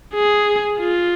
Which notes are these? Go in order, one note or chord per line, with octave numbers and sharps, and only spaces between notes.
G#4
F4